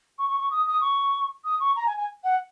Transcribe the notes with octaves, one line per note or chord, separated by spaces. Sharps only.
C#6
C#6
C#6
D#6
D#6
C#6
D#6
C#6
A#5
G#5
G#5
F#5